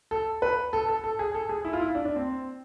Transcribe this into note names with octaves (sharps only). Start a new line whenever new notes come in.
A4
B4
A4
A4
A4
G#4
A4
G#4
E4
F4
E4
D4
D4
C4